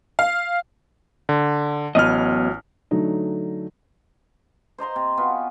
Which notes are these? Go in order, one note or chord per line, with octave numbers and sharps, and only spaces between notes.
F5
D3
A1 F#3 B3 D#5 F6
D3 F#3 A3 D#4
C5 D#5 A#5 C6
C3
B3 F4 F#4 G#5